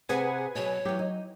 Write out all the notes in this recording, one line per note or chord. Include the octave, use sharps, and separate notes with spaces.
C3 C4 G#4 B4 F#5 G#5
B2 F#3 C#5
E3 F#3 G4
D#4